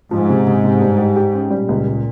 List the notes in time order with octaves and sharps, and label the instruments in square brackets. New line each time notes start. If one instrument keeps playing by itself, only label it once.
[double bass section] G#2 [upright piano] F3
[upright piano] C3
C3
C3
G2
G4
G4
C#4
[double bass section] A#2 [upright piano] G3
[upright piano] C#2
C#2